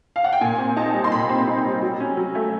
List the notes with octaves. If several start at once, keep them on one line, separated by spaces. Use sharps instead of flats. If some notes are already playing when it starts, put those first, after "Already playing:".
F5
F#5
G5
A#2 G#5
C4
D#4 A5
G3
C6
A#2 B5
C4
D#4
G3
F#3
C#4
F#3
A3